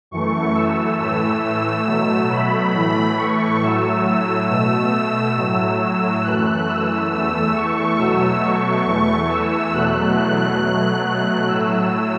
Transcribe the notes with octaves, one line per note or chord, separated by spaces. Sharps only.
F#2 E3 A3 C#6
E6
A2 E3 A3 E6
E6
B2 F#3 A3
B5
A2 E3 A3
C#6
A2 F#3 A3 E6
E6
B2 A3 E6
A2 F#3 A3
E6
F#2 E3 A3 F#6
E6
E2 E3 A3 E6
C#6
B2 F#3 A3 E6
C#6
E2 E3 A3
E6
E2 B2 F#3 A3 F#6
F#6
B2 F#3 A3
F#6
A2 F#3 A3 E6